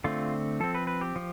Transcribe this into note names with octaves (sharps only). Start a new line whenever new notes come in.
D3 A3 C4 F4
F3 C4 A4
B4
B4
G4
F3